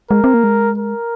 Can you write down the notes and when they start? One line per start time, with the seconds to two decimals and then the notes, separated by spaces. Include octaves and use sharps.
0.10 G#3 A#4
0.24 C4
0.34 A#3
0.44 G#3
0.78 A#4